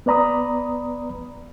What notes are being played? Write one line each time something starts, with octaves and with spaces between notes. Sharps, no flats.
B3 B4 D5 A#5 B5 D#6